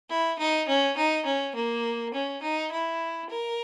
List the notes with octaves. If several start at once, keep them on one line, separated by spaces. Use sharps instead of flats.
E4
D#4
C#4
D#4
C#4
A#3
C#4
D#4
E4
A#4